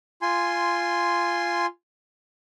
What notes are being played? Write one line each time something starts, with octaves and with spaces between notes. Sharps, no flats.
F4 G#5 C6